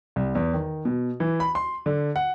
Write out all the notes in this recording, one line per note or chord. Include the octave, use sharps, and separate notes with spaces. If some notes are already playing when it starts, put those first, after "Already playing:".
C2
E2
D#3
B2
E3
B5
C6
D3
F#5